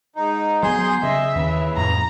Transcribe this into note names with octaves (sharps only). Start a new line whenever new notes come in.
G#2 D#4
F#3 B3 G#4 C6 G6
C#3 D#5 E5
D#2 C#3 E3
F2 A2 A#5